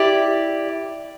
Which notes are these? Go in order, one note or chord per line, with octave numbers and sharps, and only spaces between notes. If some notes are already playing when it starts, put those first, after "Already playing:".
Already playing: E4 G4 D5